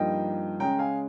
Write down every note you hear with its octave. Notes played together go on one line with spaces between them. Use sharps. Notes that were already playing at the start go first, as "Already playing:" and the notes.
Already playing: G2 F3 A#3 D#4 D#5 G5
C#3 G#3 C#4 G5 A#5
F5 G#5